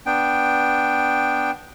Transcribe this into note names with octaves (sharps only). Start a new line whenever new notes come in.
B3 D4 G5